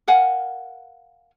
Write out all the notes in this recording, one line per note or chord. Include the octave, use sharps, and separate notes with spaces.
A#4 F5 F#5 G#5